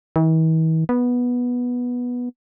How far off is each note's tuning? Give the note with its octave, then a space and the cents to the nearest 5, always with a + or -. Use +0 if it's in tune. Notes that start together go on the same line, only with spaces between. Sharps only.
E3 -45
B3 -10